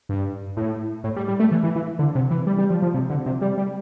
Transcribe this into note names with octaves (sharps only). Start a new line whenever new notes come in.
G2
A2
A2
G3
G3
A3
E3
E3
E3
D3
C3
E3
G3
G3
F3
F3
C3
D3
C3
G3
G3